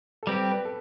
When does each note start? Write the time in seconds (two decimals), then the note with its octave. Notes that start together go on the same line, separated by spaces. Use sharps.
0.23 A4
0.27 G3 C4 G4 B4
0.50 B4
0.65 A4